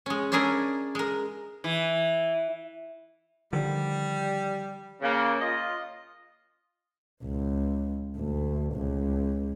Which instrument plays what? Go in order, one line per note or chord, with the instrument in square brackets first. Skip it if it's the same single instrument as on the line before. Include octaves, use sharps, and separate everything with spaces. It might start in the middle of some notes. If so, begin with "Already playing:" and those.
[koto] G#3 C#4
C#4 D4 E4 G#4 A#4 D5
G#3 A#4
[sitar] E3
[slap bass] D3 D#3 F3 [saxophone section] G3
[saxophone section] C#3 [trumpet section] A#3
[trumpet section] F4 [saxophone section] D#5
[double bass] C#2
D2
C#2